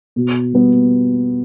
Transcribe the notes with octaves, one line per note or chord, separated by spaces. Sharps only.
B2
G3 B3